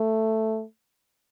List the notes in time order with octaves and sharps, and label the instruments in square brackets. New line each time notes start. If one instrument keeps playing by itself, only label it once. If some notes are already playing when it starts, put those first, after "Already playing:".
Already playing: [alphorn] A3